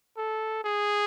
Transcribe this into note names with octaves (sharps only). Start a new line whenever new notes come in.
A4
G#4